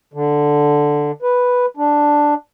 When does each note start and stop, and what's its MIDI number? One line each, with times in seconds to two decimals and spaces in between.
0.14 1.12 50
1.22 1.66 71
1.77 2.34 62